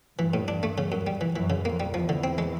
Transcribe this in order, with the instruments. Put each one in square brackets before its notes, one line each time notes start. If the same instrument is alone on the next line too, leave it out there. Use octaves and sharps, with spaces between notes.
[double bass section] G2 [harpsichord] E3
[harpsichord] A2
D4
A3
C#3
F#2
G3
E3
[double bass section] F#2 [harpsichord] E3
[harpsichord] C#3
[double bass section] F2 [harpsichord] A#3
[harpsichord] G3
[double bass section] E2 [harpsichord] F3
[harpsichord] D3
C4
G#3